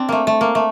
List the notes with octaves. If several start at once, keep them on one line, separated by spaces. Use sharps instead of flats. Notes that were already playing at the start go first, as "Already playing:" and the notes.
Already playing: C4 D4
A3 A#3
A3
A#3
A3